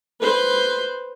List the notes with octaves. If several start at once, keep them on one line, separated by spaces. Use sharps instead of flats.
B4 C5